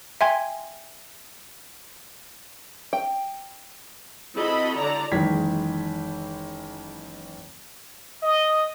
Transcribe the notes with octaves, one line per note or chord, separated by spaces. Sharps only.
E5 G5 G#5 C6 G#6
G5
C4 E4 F#4 A4 D#5 B5
D3 D5 A#5
F#1 D#3 E3 G#3 G#6 B6
D#5